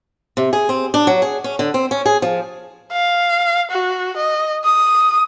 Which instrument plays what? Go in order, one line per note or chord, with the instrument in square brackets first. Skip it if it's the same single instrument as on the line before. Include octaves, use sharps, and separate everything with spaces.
[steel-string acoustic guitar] C3
G#4
C4
D4
F#3
G#4
C#4
D3
C4
C#4
G#4
F3
[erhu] F5
F#4
D#5
D#6